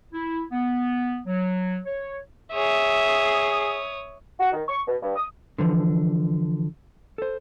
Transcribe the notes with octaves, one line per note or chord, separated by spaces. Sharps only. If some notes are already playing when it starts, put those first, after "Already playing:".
E4
B3
F#3
C#5
G#4 C#5 E5 D#6
F#4
D#3
C#6
B2
G2
D#6
D3 E3 F3
A4 C5